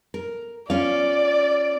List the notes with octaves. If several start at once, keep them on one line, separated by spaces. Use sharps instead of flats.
A#4
C#4 F4 D5 F5